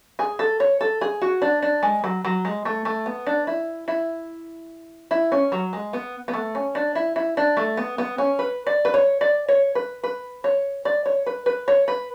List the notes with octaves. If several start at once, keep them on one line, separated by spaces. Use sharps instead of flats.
G#4
A4
C#5
A4
G#4
F#4
D4
D4
G#3
F#3
F#3
G#3
A3
A3
B3
D4
E4
E4
E4
C#4
F#3
G#3
B3
B3
A3
C#4
D4
E4
E4
D4
A3
B3
B3
C#4
B4
D5
B4
C#5
D5
C#5
B4
B4
C#5
D5
C#5
B4
B4
C#5
B4